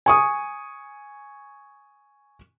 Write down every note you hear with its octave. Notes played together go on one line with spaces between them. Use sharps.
G#5 C#6 D#6